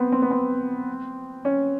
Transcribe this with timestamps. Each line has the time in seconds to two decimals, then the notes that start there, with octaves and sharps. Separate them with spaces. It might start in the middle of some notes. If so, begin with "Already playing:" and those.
Already playing: B3 C4
0.12 C4
0.22 B3
0.31 C4
1.45 C#4